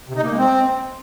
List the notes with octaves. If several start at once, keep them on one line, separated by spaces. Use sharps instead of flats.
C3
D#4
A#3
G#3
C4